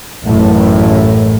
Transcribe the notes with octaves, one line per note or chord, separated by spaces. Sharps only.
A1 F#2 A2